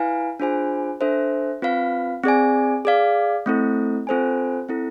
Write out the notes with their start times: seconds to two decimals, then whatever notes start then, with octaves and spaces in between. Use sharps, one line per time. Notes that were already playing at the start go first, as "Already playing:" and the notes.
Already playing: E4 B4 F5 G#5
0.40 D4 F4 G#4 C5 G#5
1.01 D4 A4 C5 E5
1.62 C4 F4 B4 F5
2.23 C4 G#4 D5 G#5
2.85 G#4 D5 F5
3.46 A3 C4 E4 A4
4.07 C4 F4 A4 C5 G#5
4.69 C4 E4 A4